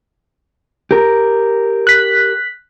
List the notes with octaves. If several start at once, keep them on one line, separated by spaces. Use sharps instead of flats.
G4 A#4
F#6 B6